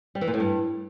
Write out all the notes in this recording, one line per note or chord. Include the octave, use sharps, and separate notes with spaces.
G3
E3
A#2
A2
G2